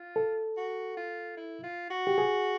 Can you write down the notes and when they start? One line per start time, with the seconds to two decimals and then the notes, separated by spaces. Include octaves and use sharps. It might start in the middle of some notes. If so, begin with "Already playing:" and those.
Already playing: F4
0.16 A4
0.57 F#4
0.97 F4
1.37 E4
1.63 F4
1.90 F#4
2.07 G4
2.18 G#4